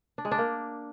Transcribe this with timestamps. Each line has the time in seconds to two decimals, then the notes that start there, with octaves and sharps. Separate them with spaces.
0.18 D4
0.25 G#3
0.31 D4
0.38 A#3